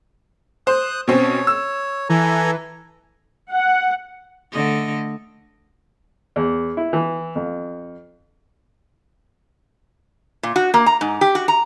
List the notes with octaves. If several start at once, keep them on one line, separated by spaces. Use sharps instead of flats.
C5 D#6 F#6
B2 C4 C#4 C#5
E6
E3 A4 G#5 A#5
F#5
D3 A3 D#5
E2
E4
E3
F2
A#2
F#4
A#3
A#5
G#2
G4
F#4
A#5